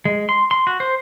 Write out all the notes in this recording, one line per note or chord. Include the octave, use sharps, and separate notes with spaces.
G#3
C6
C6
F#4
C5